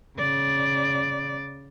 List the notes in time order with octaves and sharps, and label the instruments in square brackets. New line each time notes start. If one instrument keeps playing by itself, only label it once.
[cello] C#3 D5